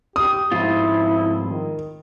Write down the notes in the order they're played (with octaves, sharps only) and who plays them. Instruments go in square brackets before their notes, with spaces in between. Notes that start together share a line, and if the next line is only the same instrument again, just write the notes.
[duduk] G4 [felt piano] D#6
[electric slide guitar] F2 G#2 F4 [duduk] E4
[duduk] D#3